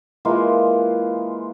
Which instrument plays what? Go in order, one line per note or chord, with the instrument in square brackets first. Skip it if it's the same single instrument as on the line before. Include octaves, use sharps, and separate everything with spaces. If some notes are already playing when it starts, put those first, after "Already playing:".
[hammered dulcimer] E3 G#3 A#3 F4